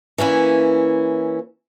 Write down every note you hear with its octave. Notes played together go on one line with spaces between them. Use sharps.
E3 A#3 C#4 E4